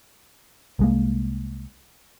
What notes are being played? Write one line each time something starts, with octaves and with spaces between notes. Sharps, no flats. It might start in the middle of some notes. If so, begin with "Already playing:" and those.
C2 G#3 A#3